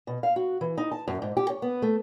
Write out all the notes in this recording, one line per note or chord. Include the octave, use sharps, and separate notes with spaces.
B2
F5
F#4
E3
D#4
A5
F#2
G#2
G4
C#5
B3
A3